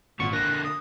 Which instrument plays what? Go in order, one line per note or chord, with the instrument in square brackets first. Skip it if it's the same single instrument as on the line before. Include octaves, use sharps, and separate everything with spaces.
[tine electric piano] G#1 C#6 [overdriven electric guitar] A#2 [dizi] F#5
[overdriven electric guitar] D3 A#3 [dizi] F#6 [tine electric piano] A#6
[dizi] D#6